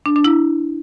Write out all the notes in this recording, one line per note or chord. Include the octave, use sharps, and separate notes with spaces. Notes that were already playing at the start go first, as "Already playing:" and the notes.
D4
D4
E4